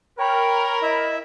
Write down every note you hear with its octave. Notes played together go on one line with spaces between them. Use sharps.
A#4 C#5 G5 B5
E4 D#5 E5